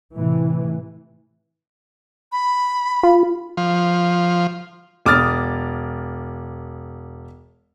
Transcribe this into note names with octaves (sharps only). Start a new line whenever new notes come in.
A2 C3 E3
B5
F4
F3
E1 D6 D#6 F6 A6